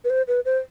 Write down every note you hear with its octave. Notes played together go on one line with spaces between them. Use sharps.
B4
C5
B4
C5